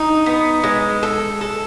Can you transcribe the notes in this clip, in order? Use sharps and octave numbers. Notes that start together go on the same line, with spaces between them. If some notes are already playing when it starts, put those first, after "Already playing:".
Already playing: D#4
B3
G#3
A4
A4